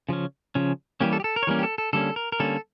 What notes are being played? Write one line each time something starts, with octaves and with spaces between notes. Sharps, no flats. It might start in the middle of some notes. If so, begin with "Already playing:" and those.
C#3 F3 C#4
C#3 F3 C#4
E3 G3 A#3 C#4 G4
A4
G4
A4
A#4
C#5
E3 G3 A#3 C#4 A#4
G4
A4
A4
D3 G3 A#3 C#4 A4
A#4
A#4
D3 G3 A#3 C#4 A4